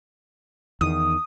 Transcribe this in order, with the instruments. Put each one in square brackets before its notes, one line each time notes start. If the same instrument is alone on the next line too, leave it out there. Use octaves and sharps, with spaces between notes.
[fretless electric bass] E2 D#3 [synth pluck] D#6